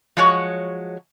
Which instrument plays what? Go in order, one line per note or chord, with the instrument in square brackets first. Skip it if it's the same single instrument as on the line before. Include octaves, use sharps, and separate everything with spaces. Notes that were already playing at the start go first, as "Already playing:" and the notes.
[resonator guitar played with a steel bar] F3 F#3 G#3 F#4 C#5